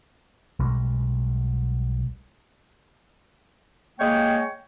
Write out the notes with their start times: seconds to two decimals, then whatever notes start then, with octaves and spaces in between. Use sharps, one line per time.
0.60 B1 B2 G3 G#3
3.99 G#3 A#3 C#5 G5